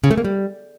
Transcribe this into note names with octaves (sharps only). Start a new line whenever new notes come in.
C#3
A3
A#3
G3